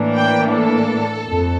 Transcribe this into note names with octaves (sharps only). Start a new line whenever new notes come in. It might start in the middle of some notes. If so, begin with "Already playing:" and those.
Already playing: A2 E3 A#3 D4
G5
A4
F2